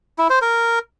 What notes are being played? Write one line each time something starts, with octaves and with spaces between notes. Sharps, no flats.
E4
C5
A#4